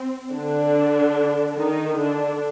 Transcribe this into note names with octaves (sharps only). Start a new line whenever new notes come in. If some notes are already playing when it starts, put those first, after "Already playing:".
Already playing: C4
D3 D4
D#3 D#4
D3 D4